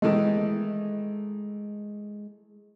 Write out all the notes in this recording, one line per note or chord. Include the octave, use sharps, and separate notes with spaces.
D#3 E3 G#3 A3